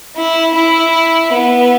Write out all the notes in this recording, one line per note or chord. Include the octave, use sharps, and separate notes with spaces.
E4
E4
B3